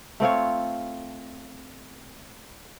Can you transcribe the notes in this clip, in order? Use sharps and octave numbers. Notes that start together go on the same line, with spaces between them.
A3 C4 F4 C#5